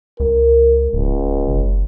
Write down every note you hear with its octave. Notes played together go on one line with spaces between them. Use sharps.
C#2 A#4
D1 C#2
F#1